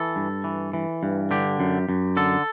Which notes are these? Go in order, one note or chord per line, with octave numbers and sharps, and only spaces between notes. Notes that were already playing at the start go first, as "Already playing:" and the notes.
Already playing: E3 A4
G2
E3
E3
G2
D3 G4
F#2
F#2
D3 A4